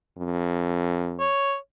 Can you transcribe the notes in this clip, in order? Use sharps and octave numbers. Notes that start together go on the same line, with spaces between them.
F2
C#5